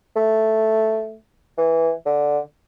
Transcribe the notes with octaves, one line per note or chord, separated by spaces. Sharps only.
A3
E3
D3